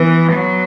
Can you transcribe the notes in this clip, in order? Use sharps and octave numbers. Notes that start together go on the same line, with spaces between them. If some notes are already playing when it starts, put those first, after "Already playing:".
Already playing: E3 B3
F#3